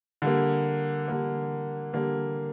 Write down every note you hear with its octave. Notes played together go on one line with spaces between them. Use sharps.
D3 G3 A#3
D3 G3 A#3
D3 G3 A#3